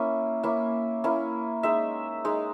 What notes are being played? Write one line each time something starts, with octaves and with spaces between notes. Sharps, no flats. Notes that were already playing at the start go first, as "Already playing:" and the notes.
Already playing: A#3 C#4 E4
A#3 C#4 E4
A#3 C#4 E4
G#3 D#4 E5
G#3 D#4